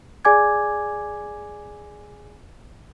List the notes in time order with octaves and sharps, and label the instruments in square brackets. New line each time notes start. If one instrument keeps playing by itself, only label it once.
[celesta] G#4 D5 G#5 D6 G#6